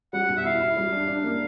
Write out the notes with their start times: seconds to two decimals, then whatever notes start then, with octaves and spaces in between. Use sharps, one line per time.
0.13 G3 F#5
0.29 B2
0.37 E5
0.45 E4 F5
0.60 E4
0.77 G3
0.92 D4
1.08 D4
1.24 A#3